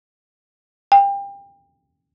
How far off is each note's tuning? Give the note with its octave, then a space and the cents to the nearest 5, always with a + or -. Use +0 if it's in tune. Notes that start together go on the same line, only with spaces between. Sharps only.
G5 +30